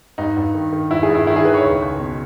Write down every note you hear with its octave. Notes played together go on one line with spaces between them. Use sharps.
G2 D#4
G2
D#3
D#3
G2 E4
G#4
G2
E4
D#3 E4
G#4
D#3 B4
C#5
C#2
C#2
B2